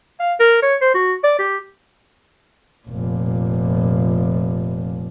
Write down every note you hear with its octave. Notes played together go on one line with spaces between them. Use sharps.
F5
A#4
C#5
C5
F#4
D5
G4
F1 A#2